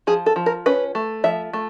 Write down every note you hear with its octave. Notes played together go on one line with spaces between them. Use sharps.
F3 G#4
A4
F3
A#4
C#4 B4
A3
F3 E5
A3